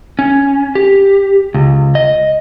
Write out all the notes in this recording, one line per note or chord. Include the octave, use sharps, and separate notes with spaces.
C#4
G4
C#2
D#5